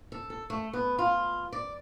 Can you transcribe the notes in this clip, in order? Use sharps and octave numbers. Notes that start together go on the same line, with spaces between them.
A4
A4
A3
B3
F4
D5